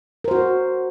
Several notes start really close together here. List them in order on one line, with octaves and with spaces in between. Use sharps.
A#4 C5 F#4